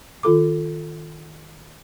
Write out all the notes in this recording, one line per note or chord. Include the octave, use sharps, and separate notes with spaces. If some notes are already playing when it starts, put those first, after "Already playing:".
D#3 F4 A4 D6